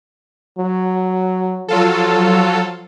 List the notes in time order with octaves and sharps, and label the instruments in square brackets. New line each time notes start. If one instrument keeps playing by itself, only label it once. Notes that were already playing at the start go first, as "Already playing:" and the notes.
[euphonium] F#3
[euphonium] F3 [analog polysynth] F#3 F4 A4